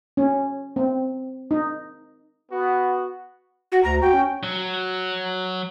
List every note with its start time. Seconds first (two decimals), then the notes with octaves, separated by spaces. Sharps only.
0.17 C#4
0.76 C4
1.51 D#4
2.52 B3 F#4
3.72 F#4
3.83 D2 A#5
4.02 F#4 G5
4.13 C#4
4.43 F#3